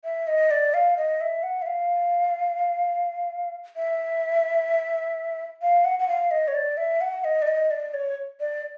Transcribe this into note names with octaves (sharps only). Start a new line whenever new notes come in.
E5
D#5
D5
F5
D#5
E5
F#5
E5
F5
E5
F5
F#5
F#5
F5
D#5
C#5
D5
E5
F#5
D#5
D5
D#5
D5
C#5
D5